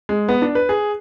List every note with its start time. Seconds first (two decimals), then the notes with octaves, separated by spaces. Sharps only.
0.09 G#3
0.29 B3
0.42 D4
0.55 B4
0.69 G#4